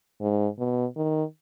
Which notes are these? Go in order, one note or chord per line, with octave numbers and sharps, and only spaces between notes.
G#2
B2
D#3